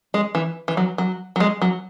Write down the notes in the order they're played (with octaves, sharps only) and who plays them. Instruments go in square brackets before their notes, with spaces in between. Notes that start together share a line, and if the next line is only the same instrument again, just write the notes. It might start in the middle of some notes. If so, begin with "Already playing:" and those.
[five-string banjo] G#3
E3
E3
F#3
F#3
F#3
G#3
F#3